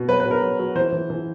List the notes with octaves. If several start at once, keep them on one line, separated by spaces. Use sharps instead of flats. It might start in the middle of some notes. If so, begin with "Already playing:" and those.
Already playing: B2
F#3 B4
B4
B2
A#4
F#3
F#3
E3 C5
E3
E3